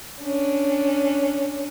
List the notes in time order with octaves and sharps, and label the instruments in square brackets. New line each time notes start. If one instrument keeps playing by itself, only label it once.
[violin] C#4 D4